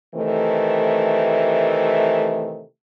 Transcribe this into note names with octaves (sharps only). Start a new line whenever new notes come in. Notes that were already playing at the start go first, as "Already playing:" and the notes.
C3 D#3 E3 A3